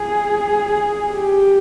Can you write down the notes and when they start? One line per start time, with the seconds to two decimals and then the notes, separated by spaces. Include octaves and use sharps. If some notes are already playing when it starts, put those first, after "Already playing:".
Already playing: G#4
1.10 G4